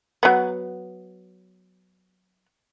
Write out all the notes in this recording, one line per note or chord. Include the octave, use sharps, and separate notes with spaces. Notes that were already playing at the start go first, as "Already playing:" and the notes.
F#3 B3